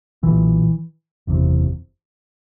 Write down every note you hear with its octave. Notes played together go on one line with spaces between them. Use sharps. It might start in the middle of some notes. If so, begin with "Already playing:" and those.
B1 A#2 E3
F#1 E2 C3